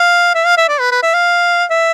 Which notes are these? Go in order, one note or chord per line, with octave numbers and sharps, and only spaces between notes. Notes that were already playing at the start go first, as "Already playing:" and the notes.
Already playing: F5
E5
F5
E5
D5
B4
B4
E5
F5
E5